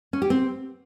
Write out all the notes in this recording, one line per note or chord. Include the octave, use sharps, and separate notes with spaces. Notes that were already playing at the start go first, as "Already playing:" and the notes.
C#4
G4
C4